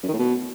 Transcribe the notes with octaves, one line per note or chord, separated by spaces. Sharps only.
F#2
D#3
A2
B2